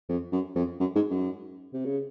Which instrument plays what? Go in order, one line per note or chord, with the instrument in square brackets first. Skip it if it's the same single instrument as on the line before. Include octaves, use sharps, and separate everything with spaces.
[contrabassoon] F2
F#2
F2
F#2
G#2
F#2
C3
C#3